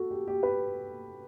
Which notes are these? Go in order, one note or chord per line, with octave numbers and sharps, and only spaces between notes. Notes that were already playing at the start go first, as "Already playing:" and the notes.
Already playing: F#4 A4
G4
G4
B4